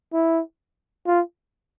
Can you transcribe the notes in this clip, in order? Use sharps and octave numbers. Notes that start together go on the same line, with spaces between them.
E4
F4